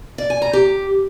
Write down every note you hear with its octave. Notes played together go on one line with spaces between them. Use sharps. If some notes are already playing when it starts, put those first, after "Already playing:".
D5
G#5
A#5
G4